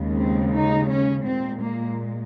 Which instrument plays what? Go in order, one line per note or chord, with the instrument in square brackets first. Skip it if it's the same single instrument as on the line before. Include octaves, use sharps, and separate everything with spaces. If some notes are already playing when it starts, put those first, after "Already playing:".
Already playing: [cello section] D#2 C#3 G#3
C4
D#4
C#4
A#2 G#3 C4
A#3